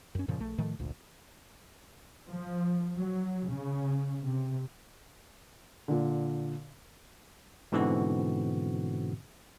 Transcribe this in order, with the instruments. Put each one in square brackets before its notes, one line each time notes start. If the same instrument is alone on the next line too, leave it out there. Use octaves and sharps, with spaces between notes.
[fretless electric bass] F#2 C#4
F#2 A#2 C#3 F3
A#1 A3
A2 D#3 F3 A3
G#1 D2 A#2
[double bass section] F3
F#3
C#3
C3
[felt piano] A#2 D3
[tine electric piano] G#2 B2 D3 E3 C4 F#4